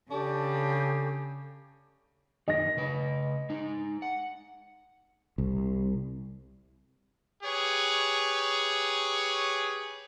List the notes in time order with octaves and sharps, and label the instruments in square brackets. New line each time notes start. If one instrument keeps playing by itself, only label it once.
[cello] C#3 [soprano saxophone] D4 [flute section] G4 A4 C#6
[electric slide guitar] F#2 D#3 [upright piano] D#5 A#6
[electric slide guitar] C#3 B4
G#3 D#4
F#5
[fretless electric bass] C2
[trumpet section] G4 G#4 B4 C#5